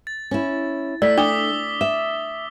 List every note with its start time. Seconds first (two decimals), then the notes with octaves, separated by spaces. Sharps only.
0.07 A6
0.31 C#4 E4
1.02 A3 D5 E6 B6
1.18 D4 D6 D#6 G7
1.81 E5